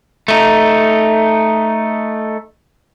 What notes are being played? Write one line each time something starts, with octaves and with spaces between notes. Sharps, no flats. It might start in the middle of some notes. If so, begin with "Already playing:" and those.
A3 D#4